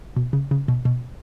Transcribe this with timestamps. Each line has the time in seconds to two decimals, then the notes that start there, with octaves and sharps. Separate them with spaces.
0.17 B2
0.33 C#3
0.51 C#3
0.68 B2
0.85 B2